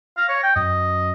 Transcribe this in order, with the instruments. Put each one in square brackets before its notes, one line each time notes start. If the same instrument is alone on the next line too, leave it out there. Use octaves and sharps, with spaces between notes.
[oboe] F5 [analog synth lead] A#6
[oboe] C#5
G5
[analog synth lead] F#2 [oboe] D#5